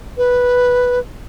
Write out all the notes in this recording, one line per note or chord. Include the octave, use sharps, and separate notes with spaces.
B4